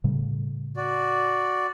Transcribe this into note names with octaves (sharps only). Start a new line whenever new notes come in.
A2 C#3 G3
F#4 D5